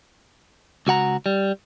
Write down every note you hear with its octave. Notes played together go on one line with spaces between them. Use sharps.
C#2 F#4 F#5 A#5
G3